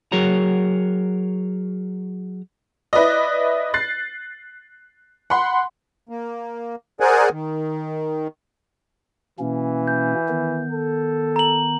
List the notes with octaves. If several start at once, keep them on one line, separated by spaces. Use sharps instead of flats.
F#3 F#4 G#4 A#4 C#5 A#5
E4 B4 D5 D#5
F#6 A6 C7
F#5 B5 C6
A#3
G#4 A#4 C5 D5 F#5 G#5
D#3
B2 E3 A#3 C#4
G6
D#3 B3
A4
A#5 F#7